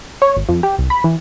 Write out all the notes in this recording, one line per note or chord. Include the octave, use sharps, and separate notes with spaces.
C#5
G#1
F2
G4
C2
B5
E3